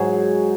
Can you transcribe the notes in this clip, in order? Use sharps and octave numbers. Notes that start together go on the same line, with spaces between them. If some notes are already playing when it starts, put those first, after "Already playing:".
Already playing: G#2 F#3 G#4